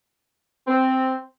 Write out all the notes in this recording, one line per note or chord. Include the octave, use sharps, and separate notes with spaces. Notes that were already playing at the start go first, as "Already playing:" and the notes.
C4